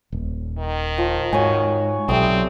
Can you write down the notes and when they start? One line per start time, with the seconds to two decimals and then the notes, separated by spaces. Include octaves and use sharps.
0.12 D#1
0.59 D#3
0.98 F3
1.33 G#2 F#4 C#5 G#5
2.09 B1 G3 A3 C4 D#6